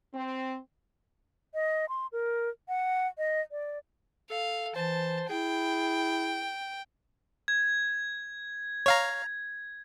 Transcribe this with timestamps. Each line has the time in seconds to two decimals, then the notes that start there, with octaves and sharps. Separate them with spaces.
0.14 C4
1.54 D#5
1.89 C6
2.12 A#4
2.68 F#5
3.18 D#5
3.51 D5
4.30 A4 F5
4.76 E3 C5 A5
5.29 E4 G#4 G5
7.48 G#6
8.86 C#5 F5 A#5